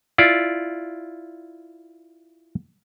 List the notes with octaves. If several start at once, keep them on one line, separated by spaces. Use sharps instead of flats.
E4 F4 D5